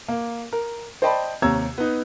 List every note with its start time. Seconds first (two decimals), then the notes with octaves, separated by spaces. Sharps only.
0.08 A#3
0.53 A#4
1.02 C5 D5 D#5 G5 A5 B5
1.42 D#2 C3 C#5 A#5 E6 G#6
1.78 B3 D#4